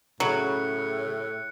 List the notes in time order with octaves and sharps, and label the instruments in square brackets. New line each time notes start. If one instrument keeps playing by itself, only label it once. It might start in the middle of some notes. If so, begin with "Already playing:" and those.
[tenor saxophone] A2 [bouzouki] C#3 [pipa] F#3 [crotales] F#6 C#7